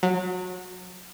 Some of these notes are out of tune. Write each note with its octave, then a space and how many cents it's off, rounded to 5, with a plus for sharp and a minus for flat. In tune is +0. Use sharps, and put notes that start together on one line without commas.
F#3 -25